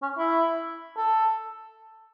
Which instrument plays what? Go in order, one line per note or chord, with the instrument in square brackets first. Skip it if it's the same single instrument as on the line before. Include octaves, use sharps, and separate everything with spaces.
[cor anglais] C#4
E4
A4